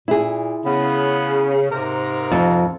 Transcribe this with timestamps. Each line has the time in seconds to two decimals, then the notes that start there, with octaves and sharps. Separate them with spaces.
0.08 A#2 E4 G#4
0.65 C#3 B3
1.70 G#2 C3 A#4
2.31 F2